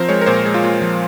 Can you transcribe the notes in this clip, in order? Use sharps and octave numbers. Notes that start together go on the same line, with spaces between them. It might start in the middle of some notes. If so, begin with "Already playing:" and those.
Already playing: F3 C4 A#4 C5
G#3 C#5
A#4
A#2 C5
G#3
F4
A#2
F3